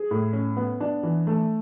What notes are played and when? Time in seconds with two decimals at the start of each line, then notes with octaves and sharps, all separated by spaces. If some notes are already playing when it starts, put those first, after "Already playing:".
Already playing: G#4
0.11 A2
0.33 C#4
0.57 B3
0.81 D4
1.03 E3
1.27 A3